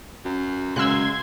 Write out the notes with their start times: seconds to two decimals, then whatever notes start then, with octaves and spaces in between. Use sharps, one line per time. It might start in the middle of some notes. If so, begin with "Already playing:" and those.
0.25 F#2
0.76 F#2 C#3 G#3 C6 E6 F#6 G#6